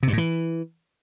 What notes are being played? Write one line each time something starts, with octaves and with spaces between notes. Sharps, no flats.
C3
G2
A2
E3